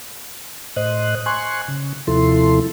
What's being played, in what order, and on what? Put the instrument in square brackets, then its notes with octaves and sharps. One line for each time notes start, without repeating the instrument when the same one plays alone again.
[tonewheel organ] A2 C5 D#5 F#6
G#5 C6 C#6 F#6
C#3
D#2 C3 F3 E4 A4 C6